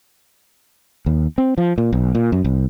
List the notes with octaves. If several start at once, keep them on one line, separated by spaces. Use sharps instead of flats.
D#2
C4
F3
A#2
B1
A#2
F#2
C2